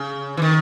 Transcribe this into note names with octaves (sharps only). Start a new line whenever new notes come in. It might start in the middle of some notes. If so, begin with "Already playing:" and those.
Already playing: C#3
E3
D#3